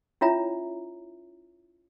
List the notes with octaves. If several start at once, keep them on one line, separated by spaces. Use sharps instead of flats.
C#4 E4 F4 C#5 E5 A#5